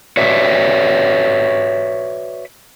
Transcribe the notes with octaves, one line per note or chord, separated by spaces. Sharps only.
F#4 B4 C#5 D5 E5